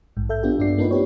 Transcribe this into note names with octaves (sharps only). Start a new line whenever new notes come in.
A#1 G#2
A4 E5 G6
B3 D4 F4 G4
G2 D4 F#4 D5 C7
A#3 C4 D4 D#4 F4 B4
B3 C4 D#4 G4 B4 C#5